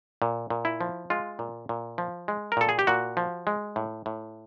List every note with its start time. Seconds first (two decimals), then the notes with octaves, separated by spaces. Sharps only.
0.22 A#2
0.50 A#2
0.65 E4
0.81 F3
1.10 G#3 F4
1.39 A#2
1.69 A#2
1.98 F3
2.28 G#3
2.52 A#4
2.57 A#2 A4
2.69 G#4
2.79 G4
2.87 A#2 F#4
3.17 F3
3.47 G#3
3.76 A2
4.06 A2